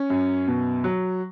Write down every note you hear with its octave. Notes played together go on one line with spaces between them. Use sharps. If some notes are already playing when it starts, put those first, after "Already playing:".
Already playing: C#4
F#2
B2
F#3